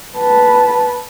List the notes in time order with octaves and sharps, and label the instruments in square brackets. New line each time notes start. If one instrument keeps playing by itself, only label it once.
[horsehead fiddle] B4 A5